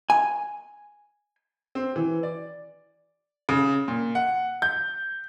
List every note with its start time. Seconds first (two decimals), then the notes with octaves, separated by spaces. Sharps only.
0.10 G#5
1.75 C4
1.96 E3
2.23 D5
3.49 C#3
3.88 A#2
4.15 F#5
4.62 G6